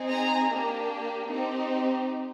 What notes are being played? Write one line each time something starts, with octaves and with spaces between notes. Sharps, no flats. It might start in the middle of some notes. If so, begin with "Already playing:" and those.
Already playing: C4 D#4 G#4
G#5 A#5
A#3 D4 G4
C4 D#4 G4